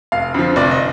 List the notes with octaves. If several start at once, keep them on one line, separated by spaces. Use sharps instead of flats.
F1 F5
F2 D3 F3
F1 D5
D#5